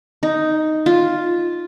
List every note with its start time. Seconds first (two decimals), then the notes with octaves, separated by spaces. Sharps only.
0.23 D#4
0.86 F4